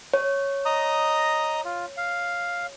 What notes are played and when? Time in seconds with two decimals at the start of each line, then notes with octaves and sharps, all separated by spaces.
0.14 C#5
0.65 D#5 A#5 D#6
1.65 F4
1.97 F5